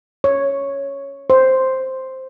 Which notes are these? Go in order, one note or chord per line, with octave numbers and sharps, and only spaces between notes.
C#5
C5